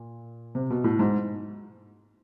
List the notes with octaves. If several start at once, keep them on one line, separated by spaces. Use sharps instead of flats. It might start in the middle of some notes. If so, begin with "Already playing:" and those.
Already playing: A#2
C3
B2
A2
G#2